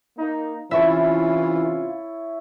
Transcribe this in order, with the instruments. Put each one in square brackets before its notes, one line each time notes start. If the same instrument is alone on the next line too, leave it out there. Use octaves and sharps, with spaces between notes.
[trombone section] A#3 D#4
[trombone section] C3 C#4 F4 [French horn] E3 [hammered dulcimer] E4 C#5 A5 [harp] E5